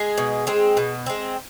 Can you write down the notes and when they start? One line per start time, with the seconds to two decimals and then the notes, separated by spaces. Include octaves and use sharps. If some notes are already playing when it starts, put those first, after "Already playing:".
Already playing: G#3 G#4
0.18 B2
0.47 G#3 C4
0.77 B2
1.06 G#3 C4